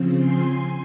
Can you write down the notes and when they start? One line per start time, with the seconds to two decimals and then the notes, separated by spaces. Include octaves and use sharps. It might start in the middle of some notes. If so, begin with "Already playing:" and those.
Already playing: C#3 F3 C4
0.17 G#5 C6